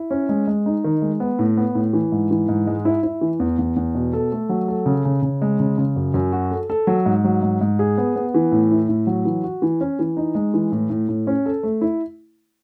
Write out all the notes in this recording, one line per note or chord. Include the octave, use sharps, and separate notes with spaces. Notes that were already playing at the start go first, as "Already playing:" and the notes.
Already playing: E4
C#4
G#3
G#3
D#4
D#3
G#3
B3
A2
B3
A2
E3
G#2
E3
G#2
G#3
E4
E4
E3
E2
E2
E2
B2
A4
A3
F#3
A4
C#3
C#3
C#3
G#3
C#3
C#3
F#2
F#2
F#4
A4
A4
F#3
G#2
F#3
G#2
G#2
G#4
B3
B3
E3
A2
E4
A2
F#3
E3
F#4
E3
C#4
E3
D#4
G#3
E3
A2
A2
A2
C#4
A4
A3
E4